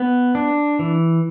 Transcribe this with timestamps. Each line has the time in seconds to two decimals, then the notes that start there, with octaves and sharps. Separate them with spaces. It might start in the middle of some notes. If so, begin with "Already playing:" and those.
Already playing: B3
0.35 D4
0.79 E3